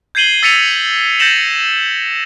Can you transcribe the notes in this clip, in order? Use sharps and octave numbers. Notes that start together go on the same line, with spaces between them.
G6 G#6 C7 D#7 F#7 G7
E6 A6 B6 C#7 D#7 F7
G6 A6 A#6 C#7 E7 F#7